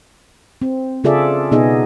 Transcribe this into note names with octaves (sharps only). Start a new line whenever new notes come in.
C4
C#3 F4 G#4 A4 D5 E5
B2 B3 D#4 G#4 D#5